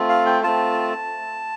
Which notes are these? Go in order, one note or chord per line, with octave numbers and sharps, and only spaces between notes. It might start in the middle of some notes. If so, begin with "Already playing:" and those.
Already playing: A3 C4 F4
F5
G5
A3 C4 F4 A5